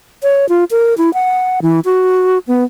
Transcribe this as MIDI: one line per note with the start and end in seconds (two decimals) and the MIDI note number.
0.23 0.49 73
0.49 0.64 65
0.71 0.94 70
0.98 1.13 64
1.14 1.60 78
1.62 1.80 52
1.85 2.39 66
2.47 2.64 59